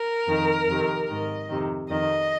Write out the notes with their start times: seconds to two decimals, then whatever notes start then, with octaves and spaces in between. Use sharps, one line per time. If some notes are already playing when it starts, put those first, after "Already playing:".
Already playing: A#4
0.27 F2 D#3
0.68 F2 C3 D#3
1.09 G#2 D#3 D#5
1.49 F2 C3 D#3
1.90 F2 D#3 D#5